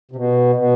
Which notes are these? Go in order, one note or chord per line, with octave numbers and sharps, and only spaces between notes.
C3
B2
B2